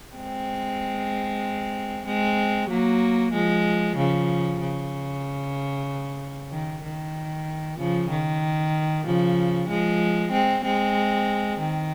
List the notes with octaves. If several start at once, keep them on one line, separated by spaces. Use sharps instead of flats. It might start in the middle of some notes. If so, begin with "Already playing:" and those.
G#3 C4
G#3 C4
F#3 A#3
F3 G#3
C#3 F3
C#3
D#3
D#3
C#3 F3
D#3
C#3 F3
F3 G#3
G#3 C4
G#3 C4
D#3